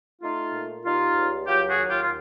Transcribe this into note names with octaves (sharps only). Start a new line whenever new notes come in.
A3 D#4 F4
A#2
G3 D#4 F4
C#2
F#3 F4 G4
F#4 G#4
D#2
F4 G4
F4